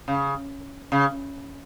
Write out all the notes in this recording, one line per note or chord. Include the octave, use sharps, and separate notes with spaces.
C#3
C#3